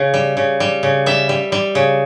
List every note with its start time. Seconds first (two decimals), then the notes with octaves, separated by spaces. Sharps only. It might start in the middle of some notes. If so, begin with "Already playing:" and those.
Already playing: C#3
0.14 G3
0.37 C#3
0.60 G3
0.83 C#3
1.06 G3 E5
1.29 G3
1.52 G3
1.75 C#3